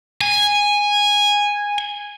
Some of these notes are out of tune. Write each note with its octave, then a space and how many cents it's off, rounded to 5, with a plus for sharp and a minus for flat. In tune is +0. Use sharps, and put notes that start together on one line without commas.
G#5 -10